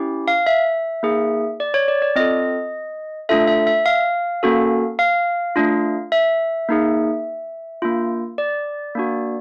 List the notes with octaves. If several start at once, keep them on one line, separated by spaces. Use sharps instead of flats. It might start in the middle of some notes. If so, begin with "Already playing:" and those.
Already playing: C#4 E4 G4
F5
E5
A#3 D#4 G#4
D5
C#5
D5
D5
C4 F4 A4 D#5
A3 D4 F4 A4 E5
E5
E5
F5
A#3 C#4 F#4 A4
F5
A3 D4 F4
E5
A#3 D#4 G#4
A#3 D4 F4
D5
A#3 D4 F#4